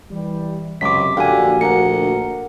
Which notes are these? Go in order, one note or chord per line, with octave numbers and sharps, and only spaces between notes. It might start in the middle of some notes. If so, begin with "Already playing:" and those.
E3 G3
C#2 F#2 C3 D6 B6
A#1 A#2 D3 F#4 G4 F5 G#5
D2 A#4 F#5 C#7